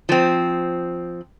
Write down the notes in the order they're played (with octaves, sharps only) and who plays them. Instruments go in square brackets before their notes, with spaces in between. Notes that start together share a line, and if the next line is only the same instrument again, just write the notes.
[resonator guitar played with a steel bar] F3 C4